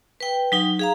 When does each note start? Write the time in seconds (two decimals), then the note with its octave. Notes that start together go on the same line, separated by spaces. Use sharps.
0.20 B4 G5
0.52 F#3 D#4 F#5
0.79 G#4 F5 A#5